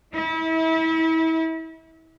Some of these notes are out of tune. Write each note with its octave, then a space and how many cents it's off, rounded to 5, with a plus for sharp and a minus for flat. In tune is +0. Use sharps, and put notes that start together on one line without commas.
E4 -35